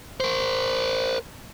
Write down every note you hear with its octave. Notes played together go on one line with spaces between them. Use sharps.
A#4 C5